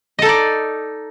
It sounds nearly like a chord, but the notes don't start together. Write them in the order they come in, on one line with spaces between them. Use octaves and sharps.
D#5 A4 D#4 D5